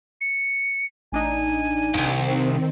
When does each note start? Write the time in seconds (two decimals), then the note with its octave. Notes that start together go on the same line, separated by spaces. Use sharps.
0.21 C#7
1.12 A1 D4 D#4 G#5
1.94 C2 F2 D#3 C4